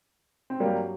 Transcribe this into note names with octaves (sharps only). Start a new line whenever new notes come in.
C4
G2 F#3 G3 A#3